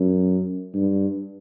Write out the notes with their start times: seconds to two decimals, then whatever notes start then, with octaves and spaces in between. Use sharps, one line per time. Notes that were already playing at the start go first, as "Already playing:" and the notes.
Already playing: F#2
0.74 G2